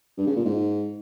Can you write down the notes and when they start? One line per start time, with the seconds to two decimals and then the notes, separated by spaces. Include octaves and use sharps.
0.17 G2
0.27 C#3
0.36 A#2
0.45 G#2